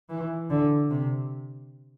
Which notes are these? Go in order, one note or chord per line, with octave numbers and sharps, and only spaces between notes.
E3
D3
C3